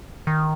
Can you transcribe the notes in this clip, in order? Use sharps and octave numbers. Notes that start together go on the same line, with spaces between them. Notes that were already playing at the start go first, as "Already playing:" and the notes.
D#3